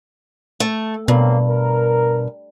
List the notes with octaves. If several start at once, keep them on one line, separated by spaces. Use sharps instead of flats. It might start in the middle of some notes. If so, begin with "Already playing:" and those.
A3
G2 B2 F#3 A#3 C4
A#4